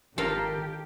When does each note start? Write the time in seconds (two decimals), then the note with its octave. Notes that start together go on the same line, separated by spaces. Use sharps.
0.18 G#1 D#3 F4 G4 A4 A#4 F5 A#5